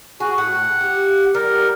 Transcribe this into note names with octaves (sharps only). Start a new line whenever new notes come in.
F#4 G#4
A2 F#5
G4
G3 A#4